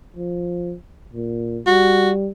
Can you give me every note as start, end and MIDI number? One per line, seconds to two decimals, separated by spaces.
0.17 0.75 53
1.13 1.61 46
1.67 2.30 55
1.67 2.11 66